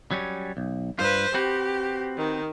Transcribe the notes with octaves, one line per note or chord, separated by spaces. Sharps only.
F#3 G3 C#4
B1
G2 F4 B4 C5
C4 F#4 G4 B4
D#3